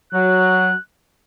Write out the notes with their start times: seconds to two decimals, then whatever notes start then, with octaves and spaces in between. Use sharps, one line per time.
0.13 F#3 F#6